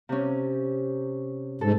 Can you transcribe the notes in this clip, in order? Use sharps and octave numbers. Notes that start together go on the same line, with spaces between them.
C3 C#4
G#2 A4